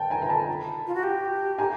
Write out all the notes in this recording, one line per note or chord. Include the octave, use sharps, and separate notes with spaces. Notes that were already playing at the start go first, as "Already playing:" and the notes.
Already playing: G5 A5
G#5 A#5
A#5
A5 B5
F4
F#4
G4
G#5 A#5